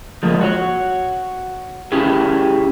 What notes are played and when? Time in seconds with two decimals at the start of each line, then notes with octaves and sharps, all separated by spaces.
0.23 F3 G#3 A#3
0.41 F#4 C#5
1.92 C#4 E4 G4 G#4